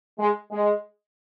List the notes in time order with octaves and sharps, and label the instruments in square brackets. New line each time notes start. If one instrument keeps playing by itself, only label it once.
[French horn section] G#3
G#3